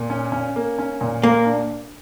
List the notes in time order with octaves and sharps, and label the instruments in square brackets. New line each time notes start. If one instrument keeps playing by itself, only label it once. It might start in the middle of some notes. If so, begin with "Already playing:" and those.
Already playing: [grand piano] A#2
C#4
C#4
A#3
C#4
A#2
[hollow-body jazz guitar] A#3 [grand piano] A#4
[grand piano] D4